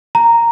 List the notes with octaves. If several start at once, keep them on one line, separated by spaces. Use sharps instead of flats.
A#5